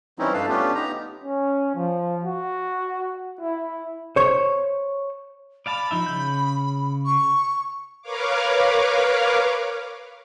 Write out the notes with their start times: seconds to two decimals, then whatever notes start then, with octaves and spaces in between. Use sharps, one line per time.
0.19 E3 G3 C4 C#4 D#4 E4
0.33 G2 D4 A4 B4 F5 A5
0.48 A3 B3 C#4 D4 F4 G4
0.75 B3 D#4 G4 A#5
1.24 C#4
1.75 F3
2.25 F#4
3.41 E4
4.16 C5 C#5
5.66 D5 F5 A5 B5
5.91 F3 D#4 E5
6.06 C#3 G6
7.05 C#6
8.02 A#4 B4 C#5 F5 D6